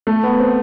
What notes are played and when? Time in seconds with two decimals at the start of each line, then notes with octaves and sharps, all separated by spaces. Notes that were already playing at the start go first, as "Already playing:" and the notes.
0.07 A3
0.23 B3
0.40 C4